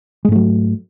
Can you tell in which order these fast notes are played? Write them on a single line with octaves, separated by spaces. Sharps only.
G#3 G#2 A3 F#3